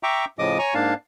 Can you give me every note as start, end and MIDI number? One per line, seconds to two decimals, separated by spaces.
0.03 0.25 76
0.03 0.25 79
0.03 0.25 82
0.03 0.25 85
0.03 0.25 86
0.39 0.58 45
0.39 0.58 49
0.39 0.58 53
0.39 0.58 75
0.39 0.58 86
0.39 0.58 87
0.59 0.74 73
0.59 0.74 80
0.59 0.74 82
0.59 0.74 85
0.74 0.94 44
0.74 0.94 58
0.74 0.94 62
0.74 0.94 77
0.74 0.94 81